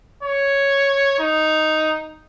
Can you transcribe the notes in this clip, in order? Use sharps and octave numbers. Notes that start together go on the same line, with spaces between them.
C#5
D#4